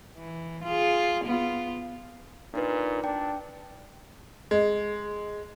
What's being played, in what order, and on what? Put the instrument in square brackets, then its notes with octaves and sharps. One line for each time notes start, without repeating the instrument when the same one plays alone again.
[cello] E3
F4 G#4
B3 F4
[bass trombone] A#2 [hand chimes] D4 D#4 B4
[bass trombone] D4 [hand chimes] G5
[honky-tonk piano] G#3